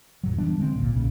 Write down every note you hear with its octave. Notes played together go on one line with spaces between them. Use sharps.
F2 A2 F#3
E3 G3 B3 D4
D3 G#3 A#3 C4
G#1 D2 A#2
B1 A#2 C#3